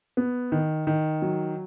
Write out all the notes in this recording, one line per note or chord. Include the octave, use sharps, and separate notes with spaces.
B3
D#3
D#3
F#3